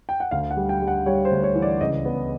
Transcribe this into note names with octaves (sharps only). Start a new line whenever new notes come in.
G5
F#5
D2 F5
F#5
G3
G5
G3
F#5
G3 C#5
C5
D2
C#5
E3
D5
C#2 D#5
B3